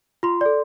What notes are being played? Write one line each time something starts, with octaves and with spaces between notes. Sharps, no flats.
F4 C6
A4 D5